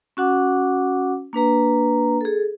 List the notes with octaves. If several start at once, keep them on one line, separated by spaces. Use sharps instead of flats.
C#4 F#4 F#5 D6
A#3 D4 B4 A#5
G#4 A4